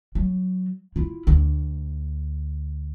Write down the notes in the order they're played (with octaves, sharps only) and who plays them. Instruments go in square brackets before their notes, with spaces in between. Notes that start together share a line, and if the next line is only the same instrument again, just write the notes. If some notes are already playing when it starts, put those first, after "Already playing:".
[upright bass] F#3
E4 F4
D2